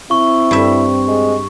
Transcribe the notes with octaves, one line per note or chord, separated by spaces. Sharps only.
C4 E4 C#6
G2 E5
G#3